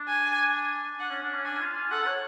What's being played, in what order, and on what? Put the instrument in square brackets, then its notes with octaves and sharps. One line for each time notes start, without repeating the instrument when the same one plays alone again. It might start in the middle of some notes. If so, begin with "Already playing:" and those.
Already playing: [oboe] D4
[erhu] G#5
[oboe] D4 [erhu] F#5
[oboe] C#4
D4
C#4
[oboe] D4 [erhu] G#5
[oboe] F4
F4
[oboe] A4 [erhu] F#5
[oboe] C#5